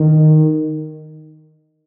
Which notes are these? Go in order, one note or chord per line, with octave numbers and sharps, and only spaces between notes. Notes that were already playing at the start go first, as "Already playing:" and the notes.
Already playing: D#3